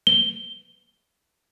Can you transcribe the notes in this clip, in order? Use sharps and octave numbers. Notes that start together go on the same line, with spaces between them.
G7